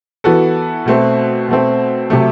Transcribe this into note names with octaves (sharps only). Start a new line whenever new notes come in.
E3 B3 F#4 A4
B2 A3 C4
B2 A3 C4
C3 F#3 A3